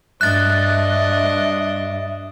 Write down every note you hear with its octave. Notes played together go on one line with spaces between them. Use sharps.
G2 D4 D#5 E5 F#6 A6